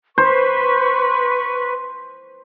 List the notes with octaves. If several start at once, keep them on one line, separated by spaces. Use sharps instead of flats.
B4 C5 C#6